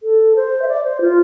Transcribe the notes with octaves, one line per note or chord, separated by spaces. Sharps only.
A4
C5
E5
D5
C5
F4